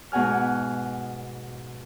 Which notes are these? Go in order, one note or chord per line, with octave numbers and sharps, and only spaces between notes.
G#2 B2 F#5 G#5 F6